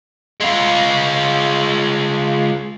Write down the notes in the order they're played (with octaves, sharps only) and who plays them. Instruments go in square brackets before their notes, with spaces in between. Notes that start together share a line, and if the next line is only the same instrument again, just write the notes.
[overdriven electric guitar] G#3 F4